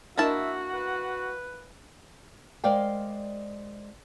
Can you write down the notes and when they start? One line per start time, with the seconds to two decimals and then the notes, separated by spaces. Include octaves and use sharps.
0.18 A#3 D4 E4 F#4 A#4 D#5 E5 A5
0.74 B4
2.64 G#3 A#4 C5 D5 F5 G5